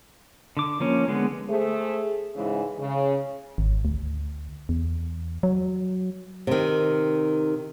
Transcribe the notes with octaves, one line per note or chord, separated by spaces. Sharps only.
D3 D6
F3 A#3 C#4
D3 G#3 B3
A3 G#4 C5
G#2 C#3 E3 G#3
C#3
G#1
D2
E2
F#3
C3 D#3